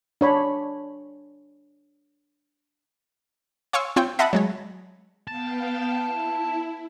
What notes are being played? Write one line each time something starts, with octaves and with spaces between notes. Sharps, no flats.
D4 C#5 B5
C#5 F5 G#5 C6 C#6 E6
C4 F4 C#5 G5
D#5 E5 F#5 A5 B5
F#3 G#3 C#5
B3 F5 G5 A5
E4